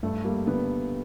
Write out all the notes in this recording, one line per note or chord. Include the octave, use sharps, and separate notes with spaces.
G2 A3
G3 A#3
D3 B3